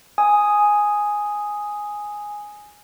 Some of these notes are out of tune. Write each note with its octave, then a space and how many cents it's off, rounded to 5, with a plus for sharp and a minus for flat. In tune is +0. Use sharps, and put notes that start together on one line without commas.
G#5 +0 D#6 +0